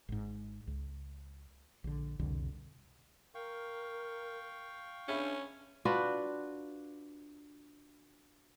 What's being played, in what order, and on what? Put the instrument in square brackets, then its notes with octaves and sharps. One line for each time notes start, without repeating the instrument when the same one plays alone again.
[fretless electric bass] G#1 G#2
C#2
A#1 D3
C2 F2 B2 D3
[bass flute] A#4 [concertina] F5 G5 C#6
[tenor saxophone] C#4 [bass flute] D4 [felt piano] G#4 E5 B5
[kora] D4 F4 F#4 B4